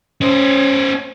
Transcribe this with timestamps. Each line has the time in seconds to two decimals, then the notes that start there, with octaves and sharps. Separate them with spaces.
0.21 C#4 C5